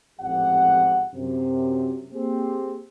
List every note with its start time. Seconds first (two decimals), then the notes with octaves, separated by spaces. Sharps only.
0.20 A1 F2 G#2 G4 F#5
1.14 F#2 C3
2.11 A#3 C4 G4 G#4